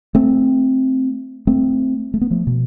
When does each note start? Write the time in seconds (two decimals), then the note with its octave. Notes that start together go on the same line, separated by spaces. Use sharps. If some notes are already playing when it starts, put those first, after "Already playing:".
0.15 A3 C4
1.47 A3 C4
2.14 A3
2.21 B3
2.31 F3 A3
2.47 B2